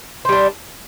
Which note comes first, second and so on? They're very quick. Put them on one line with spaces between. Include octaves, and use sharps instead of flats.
C5 G3 D4